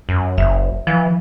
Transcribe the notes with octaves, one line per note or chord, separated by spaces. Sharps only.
F#2
F#1 E5
E3 F3